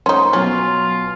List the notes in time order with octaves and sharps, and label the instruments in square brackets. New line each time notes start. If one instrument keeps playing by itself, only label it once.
[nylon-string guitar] F3 A3 [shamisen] C#4 D#4 [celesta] C6
[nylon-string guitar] B2 F#3 B3 [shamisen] C#4 [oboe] F4